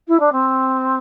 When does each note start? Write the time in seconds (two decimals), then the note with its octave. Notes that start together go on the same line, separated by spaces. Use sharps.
0.08 E4
0.20 D4
0.32 C4